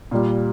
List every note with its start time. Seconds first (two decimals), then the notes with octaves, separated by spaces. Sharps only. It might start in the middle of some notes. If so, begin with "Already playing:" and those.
0.11 A#2 G3